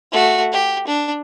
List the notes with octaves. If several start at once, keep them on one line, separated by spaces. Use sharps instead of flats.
A3 F#4
G4
D4